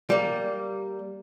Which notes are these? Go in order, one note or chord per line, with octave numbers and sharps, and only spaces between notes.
G3 A#3